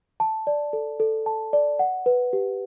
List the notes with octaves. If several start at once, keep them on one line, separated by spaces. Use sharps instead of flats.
A5
D5
A4
A4
A5
D5
F#5
B4
G4